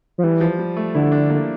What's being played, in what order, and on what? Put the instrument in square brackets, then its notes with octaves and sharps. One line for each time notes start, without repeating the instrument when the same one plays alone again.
[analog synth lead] F3
[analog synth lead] E3 [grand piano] G3
[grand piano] F3
G3
A3
[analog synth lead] D3 [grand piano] E4
[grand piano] D4
A#3